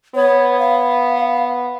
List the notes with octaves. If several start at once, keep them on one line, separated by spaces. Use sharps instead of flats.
B3 C#5
F5